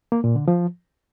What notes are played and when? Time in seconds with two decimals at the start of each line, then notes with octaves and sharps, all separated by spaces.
0.12 A#3
0.24 A#2
0.36 D3
0.48 F3